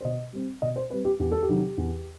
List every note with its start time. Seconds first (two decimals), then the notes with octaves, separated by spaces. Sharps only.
0.01 C5
0.04 B2 D#5
0.33 G3 C4
0.62 B2 D#5
0.76 C5
0.90 G3 C4 B4
1.05 G4
1.20 E2 G4
1.32 A4
1.42 G4
1.49 C3 D#3 F#3
1.78 E2